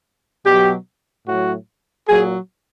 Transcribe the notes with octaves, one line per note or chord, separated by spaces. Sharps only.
B2 F#3 G4
A2 F#3 F#4
A#2 F#3 G#4